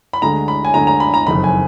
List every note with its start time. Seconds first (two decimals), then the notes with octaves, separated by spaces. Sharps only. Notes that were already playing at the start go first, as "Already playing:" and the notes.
0.13 B5
0.22 D2 D3 G#3 A#5
0.48 B5
0.65 G#5
0.74 D2 D3 G#3 A#5
0.87 A#5
1.00 B5
1.14 A#5
1.27 F#1 F2 D#3 B5
1.44 G#5